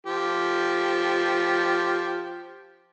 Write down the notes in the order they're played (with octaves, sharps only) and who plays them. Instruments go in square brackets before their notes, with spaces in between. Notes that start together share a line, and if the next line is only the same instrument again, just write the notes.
[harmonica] F3 G4